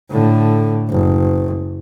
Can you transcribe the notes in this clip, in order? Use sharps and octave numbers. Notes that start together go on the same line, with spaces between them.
A2 D3
F#1